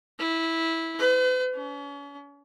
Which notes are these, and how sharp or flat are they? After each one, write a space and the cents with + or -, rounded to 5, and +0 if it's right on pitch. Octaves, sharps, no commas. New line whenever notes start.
E4 -10
B4 +45
C#4 +40